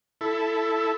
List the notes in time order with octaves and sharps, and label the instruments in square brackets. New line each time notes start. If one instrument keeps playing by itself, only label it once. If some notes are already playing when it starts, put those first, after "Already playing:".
[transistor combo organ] E4 A4